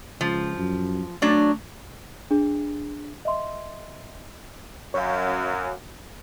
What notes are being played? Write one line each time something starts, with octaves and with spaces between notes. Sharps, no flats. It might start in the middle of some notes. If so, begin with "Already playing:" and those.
C#2 F3
F#2
F#3 A3 D4
D4 G#4
D#5 E5 C6
F#2 C#5 F5